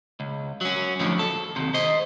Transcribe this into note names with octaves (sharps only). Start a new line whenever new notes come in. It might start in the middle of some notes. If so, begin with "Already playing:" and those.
C#2
F#3 C#4
F2 A2 D3 F3 F#3
A4
D#2 C3
C5 D#5